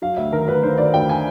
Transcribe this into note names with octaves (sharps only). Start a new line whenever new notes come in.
F#3 F5
D2 E5
D#3 A#4
D2 B4
D#3 C5
D#3 D5
D2 G5
G#5